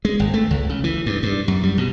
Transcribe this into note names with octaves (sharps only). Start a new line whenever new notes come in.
G#3
G#1
A3
C#2
C#3
E3
G2
G2
F#2
G3
B2